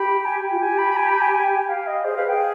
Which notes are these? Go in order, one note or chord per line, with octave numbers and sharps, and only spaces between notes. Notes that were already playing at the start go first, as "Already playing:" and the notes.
Already playing: G4 B5
G#5
G5
F4
G4 G#5
B5
B5
G#5
B5
G#5
G#5
G5
G5
F5
D#5
G#4 C5
B4 F5
G#4 G5